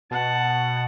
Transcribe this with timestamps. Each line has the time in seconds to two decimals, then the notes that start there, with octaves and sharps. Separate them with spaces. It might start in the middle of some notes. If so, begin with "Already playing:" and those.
0.11 B2 F#5 A5